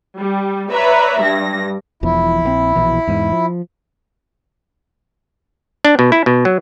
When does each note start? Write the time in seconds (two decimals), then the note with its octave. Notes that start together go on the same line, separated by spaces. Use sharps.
0.17 G3
0.71 B4 C#5 D5 E5 A#5
1.21 G2 G3 A#6
2.03 E1 E2 F3 E4
2.44 A#1 D#3 C4
2.76 A#1 B2 E3
3.07 E2 G#2
3.32 F3
5.85 D4
5.99 B2
6.12 E4
6.26 B2
6.45 F#3